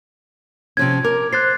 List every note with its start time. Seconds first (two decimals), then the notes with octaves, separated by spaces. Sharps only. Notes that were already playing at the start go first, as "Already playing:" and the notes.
0.77 C3 F3 C#4 G#6
1.04 A#4 D6
1.33 C5 F#6 A6 C7